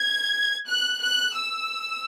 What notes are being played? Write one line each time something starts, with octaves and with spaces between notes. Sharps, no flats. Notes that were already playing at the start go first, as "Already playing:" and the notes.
Already playing: G#6
F#6
F#6
E6